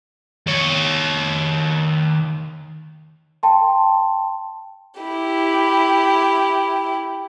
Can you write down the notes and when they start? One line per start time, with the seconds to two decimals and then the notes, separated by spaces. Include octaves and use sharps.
0.47 D#3 C#5
3.43 G5 A5 C6
5.01 E4 G4